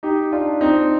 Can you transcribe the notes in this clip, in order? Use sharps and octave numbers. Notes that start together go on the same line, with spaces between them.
D#4 G4
D4 F4
C4 D#4